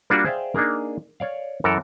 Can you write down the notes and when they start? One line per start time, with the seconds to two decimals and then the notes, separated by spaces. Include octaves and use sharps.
0.10 G3 A#3 D4 F4 F#4 D5
0.25 G#4 C5 D5 E5 F5 G5
0.55 A#3 D4 D#4 G#4 A#4
1.20 C#5 D5 F5
1.64 F#2 E3 A4 A#4